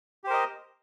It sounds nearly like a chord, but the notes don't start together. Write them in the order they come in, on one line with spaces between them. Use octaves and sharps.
G4 C5 A#4 D#5